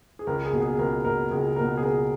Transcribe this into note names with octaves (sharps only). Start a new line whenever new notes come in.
G#4
C#2 A#4
G#4
B2 A#3
G#4
C#2 A#4
B2 A#3 A#4
C#2 G#4
B2 A#3 A#4
G#4
C#2 A#4